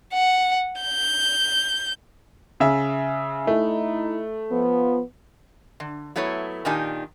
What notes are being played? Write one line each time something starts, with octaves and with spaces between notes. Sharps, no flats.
F#5
G6
C#3 E5
A3 D#4 E4
F3 B3
D3
F#3 A3 B3 E4 C#5
A#2 D#3 D4 D#4 G4 G#5